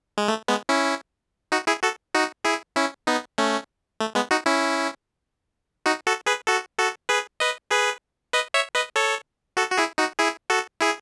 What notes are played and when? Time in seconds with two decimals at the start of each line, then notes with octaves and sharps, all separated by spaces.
0.18 G#3
0.28 A3
0.48 G#3 B3
0.69 C#4 E4
1.52 D#4 F#4
1.67 E4 G#4
1.83 F#4 A4
2.14 D#4 F#4
2.44 E4 G#4
2.75 C#4 E4
3.07 B3 D#4
3.38 A3 C#4
4.00 A3
4.15 G#3 B3
4.31 D#4 F#4
4.46 C#4 E4
5.86 D#4 F#4
6.06 F#4 A4
6.26 G#4 B4
6.47 F#4 A4
6.78 F#4 A4
7.09 G#4 B4
7.40 B4 D#5
7.71 G#4 B4
8.33 B4 D#5
8.54 C#5 E5
8.75 B4 D#5
8.96 A4 C#5
9.57 F#4 A4
9.71 F#4
9.77 E4 G#4
9.98 D#4 F#4
10.19 E4 G#4
10.50 F#4 A4
10.81 E4 G#4